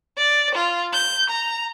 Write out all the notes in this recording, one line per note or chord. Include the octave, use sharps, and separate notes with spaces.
D5
F4
G6
A#5